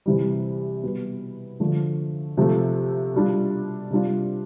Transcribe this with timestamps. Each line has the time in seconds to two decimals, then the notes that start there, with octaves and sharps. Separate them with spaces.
0.06 C3 E3 G3
0.83 B2 G3 B3
1.60 D3 F3 A3
2.37 C3 F3 A3
3.14 B2 G3 D4 F4
3.91 C3 G3 D4 F4